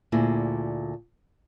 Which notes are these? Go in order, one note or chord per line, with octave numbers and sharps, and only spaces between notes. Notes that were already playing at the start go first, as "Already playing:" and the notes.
D2 A#2 E4 G#4